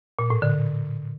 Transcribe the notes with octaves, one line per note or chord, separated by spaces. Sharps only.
A#2
A2
D3